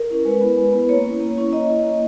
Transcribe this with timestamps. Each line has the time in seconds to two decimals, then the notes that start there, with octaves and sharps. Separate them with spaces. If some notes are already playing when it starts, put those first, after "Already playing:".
Already playing: A#4
0.10 C#4 E4
0.25 G#3 B4
0.41 B3 E4
0.57 G#3
0.73 B3 E4
0.89 A#3 C#5
1.05 C#4 E4
1.21 A#3
1.37 C#4 E4
1.52 A#3 D#5
1.69 E4
1.84 A#3